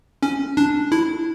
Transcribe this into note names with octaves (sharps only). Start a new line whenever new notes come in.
C#4
D4
E4